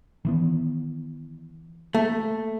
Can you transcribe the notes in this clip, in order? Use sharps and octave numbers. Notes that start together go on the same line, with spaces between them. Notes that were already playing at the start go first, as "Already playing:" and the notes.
D#3 E3 B3
A3 A#3